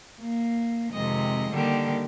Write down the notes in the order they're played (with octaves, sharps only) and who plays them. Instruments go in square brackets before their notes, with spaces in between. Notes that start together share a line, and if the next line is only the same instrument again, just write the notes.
[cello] A#3
[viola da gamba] F2 D#3 D#5 [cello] C3 G#3
[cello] D3 D#3 [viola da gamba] G3 A#3 G4